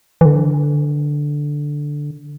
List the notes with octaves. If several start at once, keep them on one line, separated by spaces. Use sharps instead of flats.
E3
D3